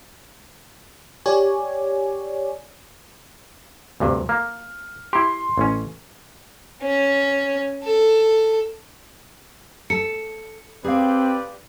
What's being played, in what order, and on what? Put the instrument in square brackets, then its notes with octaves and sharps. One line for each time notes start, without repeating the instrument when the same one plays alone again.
[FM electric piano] G4 C#5 D5 G#5
[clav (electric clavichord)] D2 G2 C3
[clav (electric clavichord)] A#3 [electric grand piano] F6
[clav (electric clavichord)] E4 G4 [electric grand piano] C6
[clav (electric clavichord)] A1 C#4
[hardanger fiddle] C#4
A4
[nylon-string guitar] A4 [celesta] C#7
[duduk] C4 [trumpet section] G4 B4 D5 [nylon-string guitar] G#4 F5